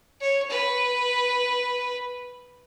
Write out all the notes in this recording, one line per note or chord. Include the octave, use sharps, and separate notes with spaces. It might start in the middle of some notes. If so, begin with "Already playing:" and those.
C#5
B4